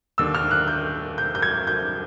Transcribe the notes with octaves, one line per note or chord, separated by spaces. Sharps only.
D#2 D3 E6
F6
F#6
G6
G6
G6
G#6
G6